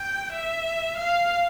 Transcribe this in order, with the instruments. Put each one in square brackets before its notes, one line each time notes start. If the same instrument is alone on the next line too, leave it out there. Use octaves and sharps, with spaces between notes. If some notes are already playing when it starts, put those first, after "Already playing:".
Already playing: [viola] G5
E5
F5